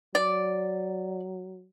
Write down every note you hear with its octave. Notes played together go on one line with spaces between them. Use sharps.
F#3 D5